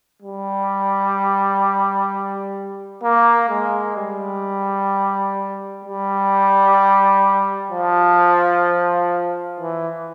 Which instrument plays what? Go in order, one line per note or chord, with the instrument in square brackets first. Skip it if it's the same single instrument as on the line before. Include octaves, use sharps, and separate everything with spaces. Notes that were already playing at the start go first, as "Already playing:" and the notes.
[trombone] G3
A#3
G#3
G3
G3
F3
E3